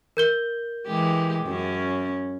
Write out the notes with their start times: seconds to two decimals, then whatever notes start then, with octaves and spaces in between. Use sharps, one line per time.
0.17 A#4 G6 G7
0.87 E3 G#3 G4
1.45 F#2 C#4